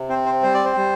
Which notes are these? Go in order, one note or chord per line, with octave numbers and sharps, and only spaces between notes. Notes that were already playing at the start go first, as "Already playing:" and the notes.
Already playing: C3
C4 C5
C5
G3 C5
D5
C5
G3